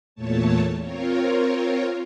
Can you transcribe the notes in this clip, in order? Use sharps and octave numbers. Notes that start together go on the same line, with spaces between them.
E2 A#2 A3 C#5 A5
C4 F4 A#4 C#5